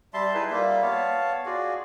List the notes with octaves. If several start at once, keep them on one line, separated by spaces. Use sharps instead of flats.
G3 E5 A5 C6
D#4 E4 G#4 B4
G3 A#3 F4 E5
B3 C#5 F5 A5
F4 F#4 G#4 D5